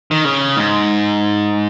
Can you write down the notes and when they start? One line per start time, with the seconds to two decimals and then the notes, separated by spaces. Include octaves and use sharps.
0.11 D#3
0.25 C#3
0.57 G#2